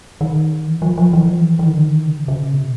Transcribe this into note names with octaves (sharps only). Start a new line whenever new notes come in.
D#3
E3
F3
F3
E3
F3
E3
E3
D#3
D3
D#3
C#3
C#3
B2